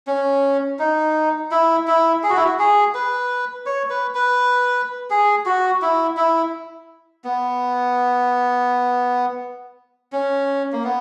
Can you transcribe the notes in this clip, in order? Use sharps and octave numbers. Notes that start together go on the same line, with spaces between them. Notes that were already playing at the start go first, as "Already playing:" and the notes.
C#4
D#4
E4
E4
G#4
F#4
E4
F#4
G#4
B4
C#5
B4
B4
G#4
F#4
E4
E4
B3
C#4
A#3
B3